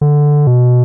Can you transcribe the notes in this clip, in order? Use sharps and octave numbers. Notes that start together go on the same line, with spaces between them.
D3
B2